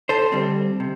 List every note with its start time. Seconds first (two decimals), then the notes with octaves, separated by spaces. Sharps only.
0.09 A4 C5
0.32 D2 D3 G3 C4
0.80 C3